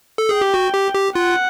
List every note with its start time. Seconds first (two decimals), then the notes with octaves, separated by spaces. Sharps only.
0.18 A4
0.29 G#4 G5
0.41 G4
0.54 F#4
0.74 G4
0.94 G4
1.15 F4 F#5